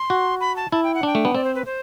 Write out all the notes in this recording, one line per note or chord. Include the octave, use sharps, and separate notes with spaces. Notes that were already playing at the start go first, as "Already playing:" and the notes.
Already playing: C6
F#4
B5
A5
E4 A5
G5
F#5
D4 G5
A3
B3
C4 D5
C5
B4
C5